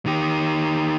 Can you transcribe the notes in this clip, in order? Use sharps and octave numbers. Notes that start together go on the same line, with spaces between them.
D#3 G4